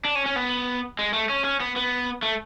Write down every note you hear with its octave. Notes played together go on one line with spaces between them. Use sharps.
D4
C#4
C#4
B3
G#3
A3
C#4
C#4
B3
B3
A3